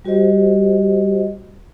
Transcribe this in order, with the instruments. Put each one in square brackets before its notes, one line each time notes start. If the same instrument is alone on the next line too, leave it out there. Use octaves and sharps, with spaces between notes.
[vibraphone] G3 F#4 G4 C5 D#5